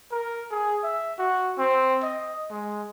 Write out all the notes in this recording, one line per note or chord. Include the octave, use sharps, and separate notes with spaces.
A#4
G#4
E5
F#4
C4
D#5
G#3